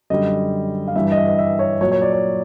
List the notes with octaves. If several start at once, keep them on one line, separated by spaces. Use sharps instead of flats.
F#2 D3 G3 D#5
F5
G2 E3 G3 E5
D#5
E5
D#5
E5
C#5
A#2 F#3 C#5
C#5
D5
C#5